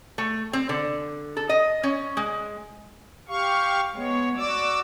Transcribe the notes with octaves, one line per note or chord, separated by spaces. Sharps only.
A3
C4
D3
A4
D#5
C#4
G#3
G4 F5 C#6
G#3 B3 C#5
F#4 D5 D6 E6